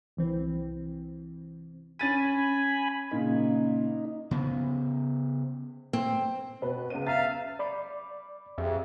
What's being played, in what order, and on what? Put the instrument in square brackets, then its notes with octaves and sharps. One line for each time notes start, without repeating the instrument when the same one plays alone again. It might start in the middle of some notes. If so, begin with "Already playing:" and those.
[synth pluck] C2 E3 C4
[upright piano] C#4 A6 D#7 [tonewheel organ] G#5 B5
[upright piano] A#2 C#3 [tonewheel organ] D#4
[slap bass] C#3 B3
[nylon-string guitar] C4
[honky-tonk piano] B2 B4
C#2 B3 D#7
[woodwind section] E5 F5 [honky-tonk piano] A#5 A6
[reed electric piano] D5 B5 D6
[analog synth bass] F2 [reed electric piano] G4 G#4 E5